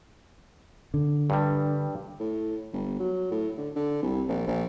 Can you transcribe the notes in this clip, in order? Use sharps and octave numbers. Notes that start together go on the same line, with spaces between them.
D3
G2 G3
A2
G1
F#3
A2
D3
D3
C2
A#1
A#1